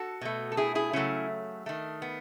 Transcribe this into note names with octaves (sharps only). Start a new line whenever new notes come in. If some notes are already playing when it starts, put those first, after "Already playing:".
Already playing: F#4 A4
B2 A3
A4
E4 G#4
E4 G#4
C#3 F#3 A3 C#4 E4
D#3 A3
B3